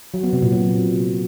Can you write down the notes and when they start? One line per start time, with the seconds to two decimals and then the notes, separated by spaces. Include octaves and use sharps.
0.14 F#3
0.23 B3
0.33 C3
0.43 A#2
0.52 F#3